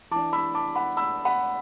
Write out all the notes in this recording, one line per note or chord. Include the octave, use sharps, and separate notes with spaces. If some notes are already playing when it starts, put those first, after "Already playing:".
E3 D4 A5 D6
B5 E6
A5 D6
F#5 B5
B5 E6
F#5 B5